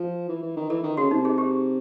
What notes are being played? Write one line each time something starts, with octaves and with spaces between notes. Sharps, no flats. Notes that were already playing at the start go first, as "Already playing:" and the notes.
Already playing: F3
E3
E3
D#3
E3 A4
D#3
C#3 F#4
C3 D#4
G#4
G4